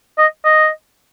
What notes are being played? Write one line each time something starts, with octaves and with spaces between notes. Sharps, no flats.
D#5
D#5